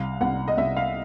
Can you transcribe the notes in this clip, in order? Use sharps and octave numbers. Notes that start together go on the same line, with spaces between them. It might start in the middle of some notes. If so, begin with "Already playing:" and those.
Already playing: C2 F5
C2 F#5
D#5
C2 E5
F5